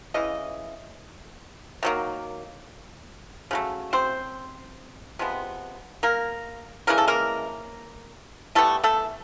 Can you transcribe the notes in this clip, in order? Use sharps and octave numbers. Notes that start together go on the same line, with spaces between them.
C#3 E3 D#5
D#3 F#3 A#3
C#3 F#3 A3
C4 C5
C3 F3 G#3 B3
A#3 A#4
C#3 E3 G#3 A#4
A4
A#3 A#4
E3 G3 A3 B3 A4
A3 A4